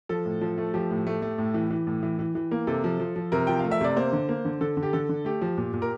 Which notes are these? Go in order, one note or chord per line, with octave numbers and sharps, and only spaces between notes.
F3 A4
A2
F3
A3
F3 G4
A2
A3
A3
A2
E3
E3
A2
E3
E3
E3
A#3
C3 A4
F3
F3
F3
C3 A#4
F3 G5
F5
A3
E5
C3 D5
A#3 C5
D3
A#3
D3
D3 A4
D3
G4
D3 A4
D3
A3 G4
F3
A#2
A#2
A#4